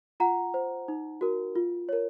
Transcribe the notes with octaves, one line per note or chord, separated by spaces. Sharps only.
F4 F#5 A#5
C5
D#4
F#4 A#4
F4
A#4 C#5